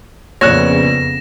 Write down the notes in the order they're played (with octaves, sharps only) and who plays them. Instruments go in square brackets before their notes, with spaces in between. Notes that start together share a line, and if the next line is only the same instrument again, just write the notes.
[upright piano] A#1 [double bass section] F2 C#3 B3 [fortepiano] C#5 F#6 [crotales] A#6 E7